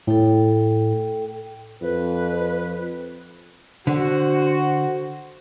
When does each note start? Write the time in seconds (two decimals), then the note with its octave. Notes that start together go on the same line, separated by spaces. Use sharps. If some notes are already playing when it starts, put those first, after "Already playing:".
0.07 A2 A4 G5
1.82 F2 B4
3.87 D3 F#4 C5